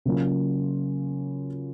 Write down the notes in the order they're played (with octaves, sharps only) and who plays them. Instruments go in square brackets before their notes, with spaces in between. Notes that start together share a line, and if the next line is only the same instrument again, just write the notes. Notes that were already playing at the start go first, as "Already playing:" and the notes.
[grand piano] C#3 F#3 A#3 C#4 F4